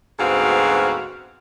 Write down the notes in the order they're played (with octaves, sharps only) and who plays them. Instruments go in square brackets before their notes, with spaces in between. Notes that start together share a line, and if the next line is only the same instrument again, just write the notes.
[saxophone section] D2 G#2 B3 C4 F#4 F5